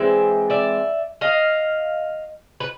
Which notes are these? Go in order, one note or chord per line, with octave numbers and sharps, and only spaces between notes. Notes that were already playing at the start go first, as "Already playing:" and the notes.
Already playing: E3 G#3 C4 D5 E5
D5 E5
D#5 F5
B4